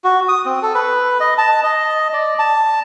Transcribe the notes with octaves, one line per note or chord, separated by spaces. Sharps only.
F#4
D#6
C4
A4
B4
D#5
A5
D#5
D5
A5